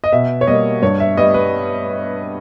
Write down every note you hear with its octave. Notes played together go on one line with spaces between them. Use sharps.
D#5
B2 E5
C#5
G3 A#3 D#5
G2 C#5
E5
G3 B3 D#5
B4